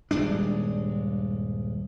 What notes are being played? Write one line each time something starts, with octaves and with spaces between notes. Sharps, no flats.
D#1 G2 G#3 D4